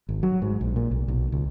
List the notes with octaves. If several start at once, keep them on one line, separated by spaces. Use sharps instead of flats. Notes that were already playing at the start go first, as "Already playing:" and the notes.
G#1
F#3
G#2
A#1
A#2
B1
B1
C#2